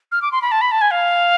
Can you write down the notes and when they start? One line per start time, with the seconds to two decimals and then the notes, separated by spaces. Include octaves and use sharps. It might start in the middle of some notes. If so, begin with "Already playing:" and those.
0.12 F6
0.22 D6
0.32 C6
0.42 B5
0.52 A5
0.61 B5
0.72 A5
0.81 G#5
0.91 F5